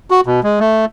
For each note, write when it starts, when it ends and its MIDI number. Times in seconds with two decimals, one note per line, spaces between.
0.11 0.21 66
0.26 0.40 47
0.43 0.59 56
0.60 0.85 57